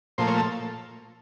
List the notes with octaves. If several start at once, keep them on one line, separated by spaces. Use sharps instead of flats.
A#2 F3 A3 C5
C#5
A4